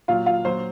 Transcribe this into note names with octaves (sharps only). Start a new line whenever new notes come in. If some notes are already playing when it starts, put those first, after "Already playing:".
A#2 F#3 F4 F5
F4 F5
A#2 F#3 C5